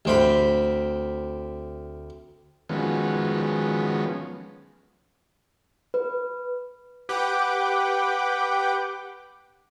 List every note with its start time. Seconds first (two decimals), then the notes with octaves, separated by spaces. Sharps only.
0.05 D2 C4 B5
2.69 D#3 F3 F#3 G#3 B3 C#4
5.94 B4
7.09 G4 B4 F#5 G5 D6